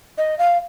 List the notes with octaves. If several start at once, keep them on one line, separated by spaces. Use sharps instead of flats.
D#5
F5